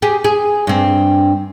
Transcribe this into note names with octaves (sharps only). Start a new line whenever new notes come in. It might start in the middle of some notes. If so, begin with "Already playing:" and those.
G4 G#4
G#4
G2 C4